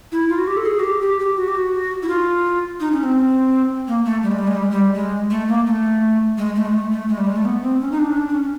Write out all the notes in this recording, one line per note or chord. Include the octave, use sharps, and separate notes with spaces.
E4
F4
F#4
G4
A4
G#4
F#4
G4
G4
G4
F#4
G4
F#4
E4
F4
D#4
C#4
C4
A#3
A3
G3
G#3
G3
G#3
G3
G#3
G3
G#3
A3
A#3
A3
G#3
A3
G#3
A3
A3
G#3
G3
G#3
A3
B3
C4
C#4
D#4
D4
C#4
D4
D4
C#4